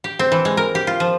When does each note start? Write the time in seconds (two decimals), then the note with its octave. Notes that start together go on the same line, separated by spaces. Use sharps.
0.04 G4
0.19 C4
0.32 E3
0.45 G#3
0.57 A#4
0.75 G4
0.87 F4
1.00 F3